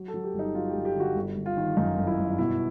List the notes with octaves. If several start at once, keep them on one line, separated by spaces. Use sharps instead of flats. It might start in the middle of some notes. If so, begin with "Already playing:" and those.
Already playing: F#3
A4
F#3
G4
G1
D#4
F#3 F4
G4
G1
G4
D3
F#4
G1
G1
F4
D#3
F#2 D#4
G1
E4
G1
B2 E4